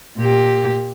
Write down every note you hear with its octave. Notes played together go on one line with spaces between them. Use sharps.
A#2 G4